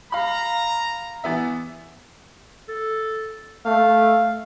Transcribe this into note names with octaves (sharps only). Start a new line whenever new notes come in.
F5 A#5 B5
E3 B3 E5
A4
A3 F5